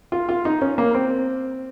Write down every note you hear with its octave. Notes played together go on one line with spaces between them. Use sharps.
F4
F4
D#4
C#4
A#3
C4